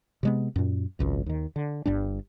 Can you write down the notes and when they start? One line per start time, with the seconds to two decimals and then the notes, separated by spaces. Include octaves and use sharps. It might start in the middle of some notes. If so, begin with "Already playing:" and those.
0.23 C3 G#3 B3
0.56 F#2 A#2
0.99 G#1 C#2 F#2
1.26 D#2 D#3
1.56 D3
1.86 G1 G2 G3 D4